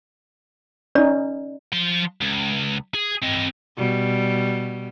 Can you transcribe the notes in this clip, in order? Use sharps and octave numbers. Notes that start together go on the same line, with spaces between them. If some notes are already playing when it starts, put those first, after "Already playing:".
C#4 D#4 D5
F3 C6
C#2
G#4
C4 D#5
B2 G3